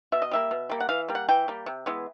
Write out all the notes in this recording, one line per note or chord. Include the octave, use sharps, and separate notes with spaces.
B2 E5
D#5
G3 A#3 E5
B2
G3 A#3
F#5
E3 F5
G3 A#3
F#5
E3 G5
G3 A#3
C3
E3 G#3 B3